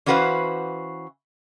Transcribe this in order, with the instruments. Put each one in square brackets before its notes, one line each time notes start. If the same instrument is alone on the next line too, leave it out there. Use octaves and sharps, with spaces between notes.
[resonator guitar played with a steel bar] E3 C#4 F#4 B4 C5 F5